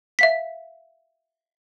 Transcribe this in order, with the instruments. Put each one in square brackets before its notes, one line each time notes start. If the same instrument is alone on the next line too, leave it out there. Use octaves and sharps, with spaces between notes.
[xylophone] E5 F5 B6